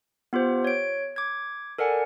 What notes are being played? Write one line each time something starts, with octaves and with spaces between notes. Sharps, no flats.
B3 F4 G4 C5
C#5 D7
D6 G#6
A4 A#4 D5 F#5 G#5